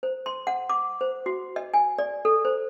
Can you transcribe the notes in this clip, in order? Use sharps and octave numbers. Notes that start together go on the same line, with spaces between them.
C5
C6
F#5
D6
C5
F#4
D#5
G#5
D5
A4
C5